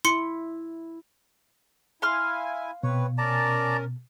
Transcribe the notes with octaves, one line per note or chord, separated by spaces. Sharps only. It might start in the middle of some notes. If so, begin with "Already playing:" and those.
E4 C6 C#7
E4 F5 G#5 C6 F6
B2 C4 B4 C#5
C#4 A#4 D5 A5 A#5